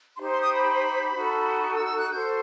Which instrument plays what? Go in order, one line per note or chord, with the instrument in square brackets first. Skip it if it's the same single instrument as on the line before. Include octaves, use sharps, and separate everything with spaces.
[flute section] D#4 G4 C5 C6
C6
D#6
B5
D#4 F#4 A4
E6
E6
F#6
F#4 A4 C5 G6